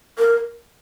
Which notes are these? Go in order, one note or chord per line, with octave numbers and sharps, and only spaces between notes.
A#4